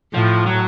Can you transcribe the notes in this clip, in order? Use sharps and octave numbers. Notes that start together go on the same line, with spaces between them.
A2 F3
F#3